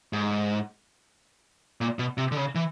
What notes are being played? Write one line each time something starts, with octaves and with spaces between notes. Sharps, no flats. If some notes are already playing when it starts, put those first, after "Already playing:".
G#2
A#2
B2
C3
D3
C#3
E3